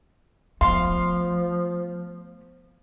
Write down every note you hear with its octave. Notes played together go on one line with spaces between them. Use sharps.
F3 A3 B3 F5 C6